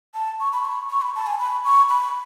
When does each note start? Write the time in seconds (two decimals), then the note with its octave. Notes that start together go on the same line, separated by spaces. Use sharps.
0.14 A5
0.40 C#6
0.53 B5
0.65 C#6
0.89 C#6
1.02 B5
1.15 A5
1.27 G#5
1.39 B5
1.64 C#6
1.89 B5